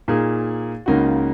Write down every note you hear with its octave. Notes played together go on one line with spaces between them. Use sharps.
A#2 A#3 D#4 G#4
C#2 C#3 A#3 D#4 F#4